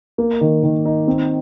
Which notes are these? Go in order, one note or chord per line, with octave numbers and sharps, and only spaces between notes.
A#3
D#3
D#3
D#4
C4